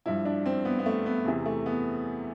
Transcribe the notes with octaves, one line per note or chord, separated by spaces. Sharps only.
G2 F3 E4
D4
C4
B3
B3
A3
B3
E2 C3 E3
A3
B3